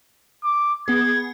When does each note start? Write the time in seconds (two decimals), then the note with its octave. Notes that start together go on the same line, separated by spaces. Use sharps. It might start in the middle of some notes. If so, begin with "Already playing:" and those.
0.44 D6
0.88 B3 G#4 G#6